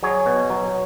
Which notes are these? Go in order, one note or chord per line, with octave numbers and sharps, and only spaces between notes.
F#3 G#4 C#5
B2
F#3